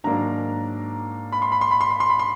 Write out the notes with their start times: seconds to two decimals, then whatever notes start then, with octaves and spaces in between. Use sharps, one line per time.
0.04 G#2 D#3 F#3 A#3 D4 A#5
1.32 B5
1.42 C6
1.52 B5
1.61 C6
1.71 B5
1.81 C6
1.91 B5
2.00 C6
2.10 B5
2.19 C6